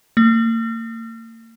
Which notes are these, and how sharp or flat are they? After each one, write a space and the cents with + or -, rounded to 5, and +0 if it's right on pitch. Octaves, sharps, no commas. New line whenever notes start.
A#3 -40